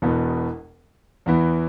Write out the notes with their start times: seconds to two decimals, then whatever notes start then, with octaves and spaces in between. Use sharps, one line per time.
0.02 E1 E2 B2 B3
1.26 E2 E3 B3 E4